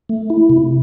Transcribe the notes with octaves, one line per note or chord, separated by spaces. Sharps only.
A3
E4
C3